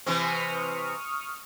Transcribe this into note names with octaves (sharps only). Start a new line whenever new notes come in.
C3 E3 C4 C#6 D#6 F6